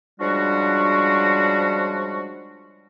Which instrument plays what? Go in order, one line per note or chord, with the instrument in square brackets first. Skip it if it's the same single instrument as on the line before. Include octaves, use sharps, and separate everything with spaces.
[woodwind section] C#3 F3 G3 G#3 D4 F#4